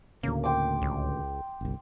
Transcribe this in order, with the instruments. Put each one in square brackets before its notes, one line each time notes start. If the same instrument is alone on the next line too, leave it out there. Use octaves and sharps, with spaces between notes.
[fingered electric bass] D2 A2 C#3 [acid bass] A#3
[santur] G5 C6 D6
[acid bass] C#2
[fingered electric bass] G1 C2